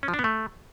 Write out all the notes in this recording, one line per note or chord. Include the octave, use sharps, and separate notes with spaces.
C#4
F3
D4
B3
A3